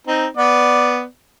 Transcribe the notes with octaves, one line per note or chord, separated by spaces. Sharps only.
C4 D#4
B3 D5